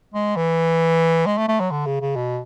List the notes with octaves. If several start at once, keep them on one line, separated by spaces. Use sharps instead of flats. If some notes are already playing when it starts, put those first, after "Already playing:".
G#3
E3
G#3
A3
A3
F#3
D3
C#3
C#3
B2